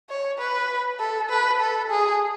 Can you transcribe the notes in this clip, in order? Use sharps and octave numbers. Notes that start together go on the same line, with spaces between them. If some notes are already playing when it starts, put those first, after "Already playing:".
C#5
B4
A4
B4
A4
G#4